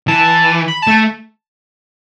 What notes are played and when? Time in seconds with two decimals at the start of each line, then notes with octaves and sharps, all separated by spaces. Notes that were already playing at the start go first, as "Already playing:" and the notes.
0.08 E3 A5
0.68 B5
0.82 A5
0.87 A3